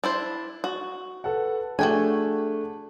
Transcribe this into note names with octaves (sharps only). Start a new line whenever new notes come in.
D4 E4 C5
F#4
A4 B4 F#5
A3 D4 F#4 G#4 G5 G#5